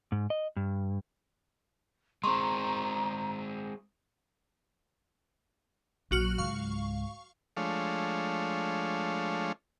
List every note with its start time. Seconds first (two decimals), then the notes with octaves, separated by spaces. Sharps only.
0.12 G#2
0.30 D#5
0.56 G2
2.24 G#3 C4 A#5 C6 C#6
6.11 A#1 F#3 F#4 F6
6.38 C#2 G#2 F5 C#6
7.57 F3 G#3 A3 D4 C#5 F5